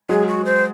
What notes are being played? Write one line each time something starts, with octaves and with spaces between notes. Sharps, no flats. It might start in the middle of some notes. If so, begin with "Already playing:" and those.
F#3 G#3 G#4
F#4
C5